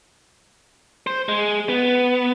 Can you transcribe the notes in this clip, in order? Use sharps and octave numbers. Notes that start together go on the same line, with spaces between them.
C5
G#3
B3